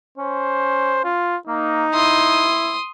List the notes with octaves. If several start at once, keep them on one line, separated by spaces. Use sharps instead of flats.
C#4 C5
F4
A#3 D#4
E4 C6 D#6